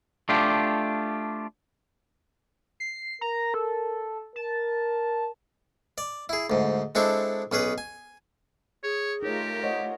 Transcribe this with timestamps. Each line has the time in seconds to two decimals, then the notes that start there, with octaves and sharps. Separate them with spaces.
0.29 A3 D4 F4 G4
2.80 C7
3.21 A#4 A#5
3.54 A4
4.36 A#4 A5
5.98 D5
6.29 E4 G#4
6.50 D2 G#2
6.95 G#3 C4 D4 E4 A4 C#6
7.52 B1 C#4 G#4 B4 D#6
7.78 G#5
8.84 G#4 C#5
9.23 A3 D#4 F4 G4 A#4 C#5
9.63 C5 C#5 D#5 F#5